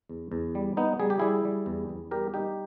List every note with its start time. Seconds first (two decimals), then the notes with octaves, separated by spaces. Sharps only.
0.09 E2
0.32 E2
0.55 G3
0.76 G3 B3 D#4
1.00 G3 G#4
1.10 G4
1.19 G3 E4 G#4
1.45 G3
1.66 E2
1.89 E2
2.11 G3 G4 A#4
2.34 G3 D#4 G4